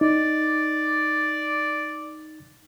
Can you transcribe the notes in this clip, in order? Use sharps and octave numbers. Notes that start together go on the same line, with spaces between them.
D#4 D5